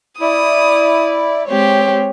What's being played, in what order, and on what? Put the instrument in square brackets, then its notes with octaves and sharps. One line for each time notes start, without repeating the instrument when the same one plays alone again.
[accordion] E4 [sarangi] D5 [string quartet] D#6
[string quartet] G#3 C4 G4 [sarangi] C#5